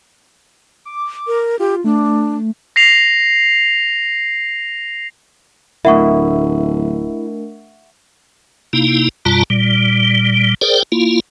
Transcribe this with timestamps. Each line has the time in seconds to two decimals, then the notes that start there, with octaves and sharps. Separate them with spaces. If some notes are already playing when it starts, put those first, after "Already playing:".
0.85 D6
1.27 A#4
1.59 F4 G4
1.84 A3 D4
2.76 A#6 C7 F7
5.85 D1 A3 D4 E4 A#4 E5 F#5 C#6
8.73 C3 A#3 D#4 E4
9.25 F#2 B2 G3 F4 A5 A#5
9.50 A#2 G3
10.61 G#4 A#4 C5 D5 G5
10.92 A#3 E4 F4